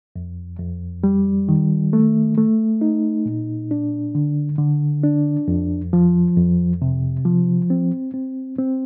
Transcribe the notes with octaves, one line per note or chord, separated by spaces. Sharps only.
F2
F2
G3
D#3
A3
A3
D#4
A#2
D4
D3
D3
D4
F2
F3
F2
C3
F3
C4
C4
C4